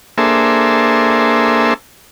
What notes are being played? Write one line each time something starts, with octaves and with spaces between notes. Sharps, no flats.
A#3 D4 G#4 A4 C5 E5